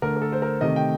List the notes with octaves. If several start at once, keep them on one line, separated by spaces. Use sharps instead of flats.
D3 A3 A#4
A#4
A4
C5
A#4
C3 D#3 A3 D#5
G5